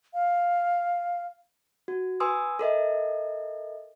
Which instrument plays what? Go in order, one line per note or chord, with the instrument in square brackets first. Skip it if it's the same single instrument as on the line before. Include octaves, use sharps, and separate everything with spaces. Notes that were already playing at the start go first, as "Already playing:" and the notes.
[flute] F5
[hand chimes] F#4
B4 G#5 C6 D#6 E6
A4 A#4 D#5 E5